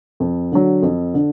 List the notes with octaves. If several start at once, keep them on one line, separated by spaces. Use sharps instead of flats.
F2
D3 F#3
F2
D3